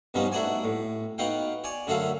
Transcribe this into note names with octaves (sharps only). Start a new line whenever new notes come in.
G2 B2 F3 B3 C#4 D#4
A3 D4 D#4 F#4 D5 G#5
A2
B3 D#4 F#4 F5 G5
C#5 D5 G#5
F#2 D3 A3 F#4 E5 F5